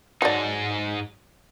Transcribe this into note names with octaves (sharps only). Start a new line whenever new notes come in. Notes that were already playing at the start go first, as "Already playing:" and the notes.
G#2 F#3 D#4 A4 D5